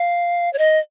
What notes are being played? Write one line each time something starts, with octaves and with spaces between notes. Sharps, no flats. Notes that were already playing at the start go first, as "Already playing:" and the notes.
Already playing: F5
C#5
D#5